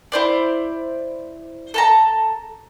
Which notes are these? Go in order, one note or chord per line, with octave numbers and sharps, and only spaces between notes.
E4 C5 D5
A4 A5 A#5